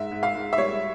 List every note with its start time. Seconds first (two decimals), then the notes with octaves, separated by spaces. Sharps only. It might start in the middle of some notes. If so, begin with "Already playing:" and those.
Already playing: G#2 E5
0.11 G#2
0.23 F5
0.34 G#2
0.53 E5
0.58 G3 C#5